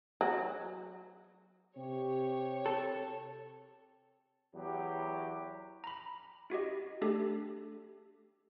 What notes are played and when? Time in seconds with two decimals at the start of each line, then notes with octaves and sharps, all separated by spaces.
0.21 F#3
1.77 C3 G4 C#5
2.66 A4
4.53 E2 F#3 G4
5.84 A#5 B5
6.50 E4 F#4 G4 D#5
7.01 A3 D4 G4 A4